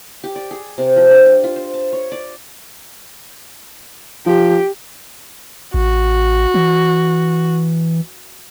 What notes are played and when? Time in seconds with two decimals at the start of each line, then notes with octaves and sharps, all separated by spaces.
0.24 G4
0.36 D5
0.51 G#4
0.78 C3
0.96 F3
1.10 D4
1.25 G4
1.44 F4
1.56 C5
1.74 A5
1.93 C#5
2.12 D5
4.26 F3 G4
5.74 A1 F#4
6.54 E3